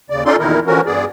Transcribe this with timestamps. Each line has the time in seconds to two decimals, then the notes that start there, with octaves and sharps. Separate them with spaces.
0.10 D#2 C#3 D5
0.25 C#4 D#4 F4 A4 D5 C6
0.39 E2 A#2 D#3 D#4 E4 A#4
0.66 D3 E3 F3 C#4 F#4 A#4
0.86 G2 B3 G#4 D5